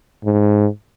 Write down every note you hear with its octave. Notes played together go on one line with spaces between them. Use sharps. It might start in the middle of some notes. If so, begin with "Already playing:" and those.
G#2